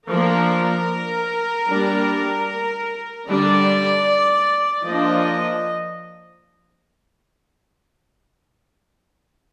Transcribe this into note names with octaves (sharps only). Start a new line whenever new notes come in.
F3 A#3 D4 A#4
G3 A#3 D4
D3 G3 D4 D5
F3 A#3 D4 D#5